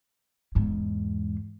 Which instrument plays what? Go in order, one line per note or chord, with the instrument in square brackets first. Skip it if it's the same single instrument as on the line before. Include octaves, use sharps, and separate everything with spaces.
[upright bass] E2 G#2